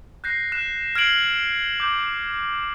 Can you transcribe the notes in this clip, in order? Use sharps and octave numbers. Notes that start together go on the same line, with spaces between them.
F#6 G6 A#6 C7
F#6 E7
F6 G#6 C7 D7 F#7
D6 G6